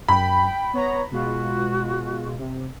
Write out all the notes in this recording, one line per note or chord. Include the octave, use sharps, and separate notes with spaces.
F#2 G5 B5
B3 C#5 A#5
B2 G#3 F4 F#4
C3